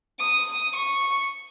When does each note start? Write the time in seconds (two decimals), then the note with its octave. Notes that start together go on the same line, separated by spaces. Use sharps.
0.20 D#6
0.75 C#6